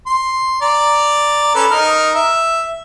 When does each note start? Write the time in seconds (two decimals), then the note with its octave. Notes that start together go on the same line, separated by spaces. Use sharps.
0.06 C6
0.62 D5 A#5
1.55 C#4 A4 B4
1.71 D#4 A#4 F6
2.15 E5